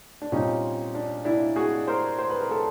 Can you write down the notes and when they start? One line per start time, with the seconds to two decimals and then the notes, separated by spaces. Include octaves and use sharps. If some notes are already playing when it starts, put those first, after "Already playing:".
0.22 D4
0.32 A#2 G3 C4 C#4 D#4
0.95 D4
1.25 D4 E4
1.56 F#4 G#4
1.88 A#4 C5
2.19 C5
2.30 B4
2.41 A#4
2.51 A4 B4